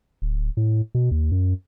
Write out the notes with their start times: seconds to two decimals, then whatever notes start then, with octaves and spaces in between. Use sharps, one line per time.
0.22 D1
0.57 A2
0.95 B2
1.11 D#2
1.32 F#2